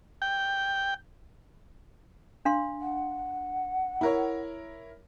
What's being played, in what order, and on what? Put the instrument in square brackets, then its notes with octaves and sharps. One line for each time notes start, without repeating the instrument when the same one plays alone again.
[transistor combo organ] G5
[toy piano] D4 F5 C6
[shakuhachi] F#5
[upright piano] E4 A#4 C#5